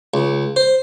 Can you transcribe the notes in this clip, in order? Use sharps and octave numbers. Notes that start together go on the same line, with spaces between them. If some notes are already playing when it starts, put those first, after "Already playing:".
C#2
C5